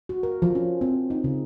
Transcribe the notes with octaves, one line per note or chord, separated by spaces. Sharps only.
F#4
A#4
F3
C#4
C4
D#4
C#3